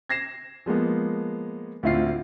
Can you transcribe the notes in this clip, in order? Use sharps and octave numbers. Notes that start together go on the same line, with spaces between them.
G#6 A#6 C7 E7
F3 G#3 A#3 B3
D2 A2 C4 E4 F4 C7